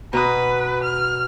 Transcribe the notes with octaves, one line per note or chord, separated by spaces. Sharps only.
B2 B4 A#5 D#6
F6